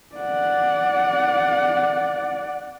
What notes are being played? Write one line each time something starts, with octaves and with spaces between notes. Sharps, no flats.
D5 F#5